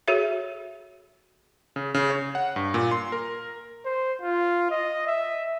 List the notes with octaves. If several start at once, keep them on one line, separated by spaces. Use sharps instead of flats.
F#4 G#4 A4 C#5 E5
C#3
C#3
C#5
F#5
G2
A#2
C6
A#4
C5
F4
D#5
E5